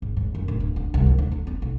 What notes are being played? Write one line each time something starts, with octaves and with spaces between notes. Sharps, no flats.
G#1
G#2
F#2
D1
D1
D3
C2
G#1
D2
D2
B3
B1